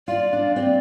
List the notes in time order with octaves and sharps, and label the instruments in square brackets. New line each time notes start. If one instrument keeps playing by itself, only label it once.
[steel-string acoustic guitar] F4 [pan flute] D5
[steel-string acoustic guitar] D4
[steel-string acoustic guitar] C4 [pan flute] D5